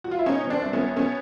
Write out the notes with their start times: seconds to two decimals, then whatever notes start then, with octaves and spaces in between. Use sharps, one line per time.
0.04 F#4
0.11 F4
0.19 E4
0.26 B2 C#4 D#4
0.44 B2
0.50 C4 D4
0.62 C2
0.73 B3 C#4
0.79 C2
0.96 B2 B3 C#4